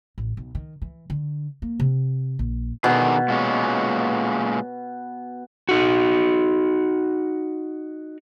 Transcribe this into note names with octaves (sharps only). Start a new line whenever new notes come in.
A1
B1
D#3
E3
D3
A#3
C3
A#1
B2 D3 D#3 G#4
A#2 G#3 C#4
D#4 F#4